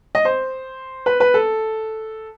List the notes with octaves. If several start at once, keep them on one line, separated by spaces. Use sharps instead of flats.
D#5
C5
B4
B4
A4